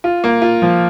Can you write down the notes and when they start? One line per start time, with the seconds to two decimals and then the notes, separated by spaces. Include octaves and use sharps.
0.04 F4
0.24 A#3
0.42 F4
0.62 F3